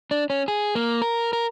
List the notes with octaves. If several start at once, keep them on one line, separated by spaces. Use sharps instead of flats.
D4
C#4
G#4
A#3
A#4
A#4